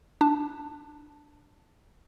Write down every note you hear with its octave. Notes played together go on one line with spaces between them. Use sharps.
D4 A5